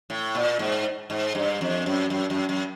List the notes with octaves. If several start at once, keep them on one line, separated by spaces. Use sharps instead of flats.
A2
A#2
G#2
G#2
G2
F2
F#2
F#2
F#2
F#2